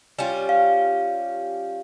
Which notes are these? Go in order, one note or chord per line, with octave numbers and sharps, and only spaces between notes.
G3 C#4 F4
F5